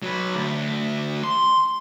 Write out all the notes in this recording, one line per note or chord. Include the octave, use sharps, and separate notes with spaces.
F#3 B4
D2
C6